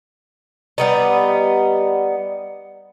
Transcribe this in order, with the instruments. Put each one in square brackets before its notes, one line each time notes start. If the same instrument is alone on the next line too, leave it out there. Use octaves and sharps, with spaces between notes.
[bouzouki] G3 B3 D#4